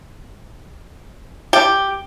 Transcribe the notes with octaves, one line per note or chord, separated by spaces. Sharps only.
G4